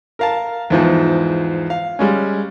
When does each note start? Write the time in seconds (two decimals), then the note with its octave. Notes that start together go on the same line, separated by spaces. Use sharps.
0.19 A#4 F5 A5
0.70 E2 G#2 F3
1.70 F5
1.99 G3 G#3 C#4